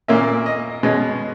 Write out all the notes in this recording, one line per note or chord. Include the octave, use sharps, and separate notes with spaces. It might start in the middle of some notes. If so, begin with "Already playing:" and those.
A#2 A#3 C#4 E5
D#5
B2 G#3 C#4